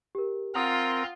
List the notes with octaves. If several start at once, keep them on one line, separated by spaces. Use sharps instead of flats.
G4 A#4
C4 F4 A#4 F#5 A#5 D#6